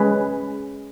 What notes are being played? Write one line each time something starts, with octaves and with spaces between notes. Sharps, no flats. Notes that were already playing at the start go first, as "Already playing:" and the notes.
Already playing: G#3 C#4 G#4 B4